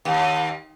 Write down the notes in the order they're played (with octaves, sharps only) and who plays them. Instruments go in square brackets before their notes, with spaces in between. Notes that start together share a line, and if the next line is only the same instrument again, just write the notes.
[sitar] D#2